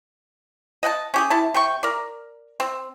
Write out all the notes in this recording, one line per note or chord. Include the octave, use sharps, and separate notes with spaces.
D#5 F#5 G5 A5
C#4 G4 G#4
C3 E4 A5
C3 G5 C#6
A#4 D5
C4